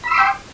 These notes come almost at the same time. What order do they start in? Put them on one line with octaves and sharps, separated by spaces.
B5 E6 C6 D6 G5